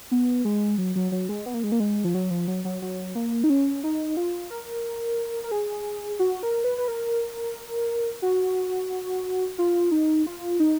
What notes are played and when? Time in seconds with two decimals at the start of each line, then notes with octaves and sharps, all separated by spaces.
0.11 B3
0.45 G#3
0.78 F#3
0.96 F#3
1.12 F#3
1.29 G#3
1.46 B3
1.54 A#3
1.64 G#3
1.72 A#3
1.80 G#3
2.04 F3
2.14 F#3
2.30 F3
2.48 F#3
2.65 F#3
2.82 F#3
3.15 A#3
3.44 D#4
3.50 C#4
3.84 D#4
4.17 F4
4.50 A#4
5.44 A#4
5.51 G#4
6.19 F#4
6.43 A#4
6.64 B4
6.78 B4
6.88 A#4
8.22 F#4
9.58 F4
9.91 D#4
10.26 F4
10.60 D#4